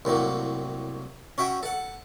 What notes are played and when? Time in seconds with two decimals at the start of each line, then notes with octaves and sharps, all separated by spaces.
0.05 C2 A2 F#3 A#3
1.38 C#4 F#4 E5 G5
1.63 A4 F#5